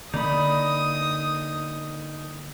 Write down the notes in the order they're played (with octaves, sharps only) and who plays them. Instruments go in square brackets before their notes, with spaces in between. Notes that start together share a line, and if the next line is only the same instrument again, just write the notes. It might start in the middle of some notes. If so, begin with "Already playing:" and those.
[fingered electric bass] D3 A#3 [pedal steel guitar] D#4 B5 [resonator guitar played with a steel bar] D5 [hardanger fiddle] D#6